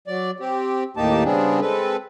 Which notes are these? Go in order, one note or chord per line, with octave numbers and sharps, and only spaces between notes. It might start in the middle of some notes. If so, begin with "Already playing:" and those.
F#3 D5
C4 G4
D#2 A2 A#3 D#4 G4 A5
C#3 G3 B3 C4 D4 G#4
G#3 C4 A4 B4